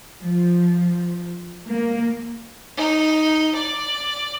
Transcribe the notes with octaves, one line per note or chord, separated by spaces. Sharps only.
F3
A#3
D#4
D5